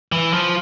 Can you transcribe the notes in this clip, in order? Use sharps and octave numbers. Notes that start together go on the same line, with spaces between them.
E3
F3